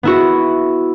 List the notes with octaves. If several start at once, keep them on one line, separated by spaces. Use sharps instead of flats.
B3 E4 F#4